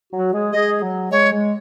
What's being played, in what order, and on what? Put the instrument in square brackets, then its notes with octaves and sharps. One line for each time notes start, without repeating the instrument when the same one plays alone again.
[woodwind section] F#3 F#4
G#3 G#4
[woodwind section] G#3 G#4 [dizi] D#5
[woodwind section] F#3
[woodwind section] G#3 [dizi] C#5
[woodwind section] G#3